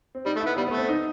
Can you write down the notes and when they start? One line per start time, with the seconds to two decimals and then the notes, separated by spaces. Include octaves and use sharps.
0.15 C4
0.26 G3 D#4
0.36 A3
0.41 E4
0.47 B3
0.57 G3 B3
0.67 B3
0.72 A3
0.78 C4
0.89 D#4